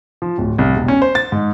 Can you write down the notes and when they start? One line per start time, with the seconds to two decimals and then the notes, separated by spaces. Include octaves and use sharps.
0.22 F3
0.38 D1
0.58 C2
0.76 E1
0.88 C#4
1.02 C5
1.15 A6
1.32 G#2